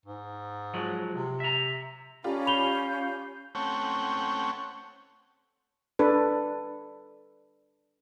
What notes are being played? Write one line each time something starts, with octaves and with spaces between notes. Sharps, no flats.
G#2
F3 F#3 G#3
C3
E5 A#5
C#4 F4 G4 A4 D5 A#5 B5
F5 B5 G6 F7 G7
A3 C4 C#4 C#5 F#5 G5
D4 A4 B4